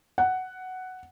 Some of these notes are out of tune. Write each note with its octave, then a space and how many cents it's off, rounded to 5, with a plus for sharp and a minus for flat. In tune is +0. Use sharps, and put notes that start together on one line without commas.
F#5 +5